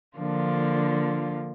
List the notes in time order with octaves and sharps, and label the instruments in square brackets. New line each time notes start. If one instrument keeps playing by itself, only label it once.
[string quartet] D3 F3 A#3 D4 F4